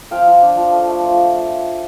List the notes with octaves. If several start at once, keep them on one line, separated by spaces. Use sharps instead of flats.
F3 F5 G5
F4
D4
F3
A3
A3
F3